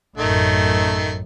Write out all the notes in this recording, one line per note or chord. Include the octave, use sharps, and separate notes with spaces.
A1 F#2 D#3 A3